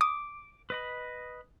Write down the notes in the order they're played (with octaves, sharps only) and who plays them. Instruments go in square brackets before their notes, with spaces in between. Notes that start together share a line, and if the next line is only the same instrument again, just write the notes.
[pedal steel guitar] D6 [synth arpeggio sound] D#6
[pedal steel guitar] B4 D#5 B5